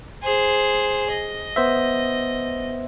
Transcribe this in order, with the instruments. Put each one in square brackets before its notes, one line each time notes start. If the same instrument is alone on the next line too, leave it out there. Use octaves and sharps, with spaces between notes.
[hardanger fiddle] G#4 C5
D#5
[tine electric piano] B3 C5 E5